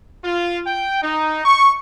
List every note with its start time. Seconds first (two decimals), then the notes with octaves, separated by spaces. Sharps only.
0.24 F4
0.67 G5
1.02 D#4
1.45 C#6